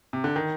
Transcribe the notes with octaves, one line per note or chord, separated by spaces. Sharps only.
C3
D3
D#3